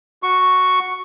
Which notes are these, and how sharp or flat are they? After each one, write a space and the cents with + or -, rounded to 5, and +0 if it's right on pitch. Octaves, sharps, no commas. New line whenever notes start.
F#4 +0 C#6 +0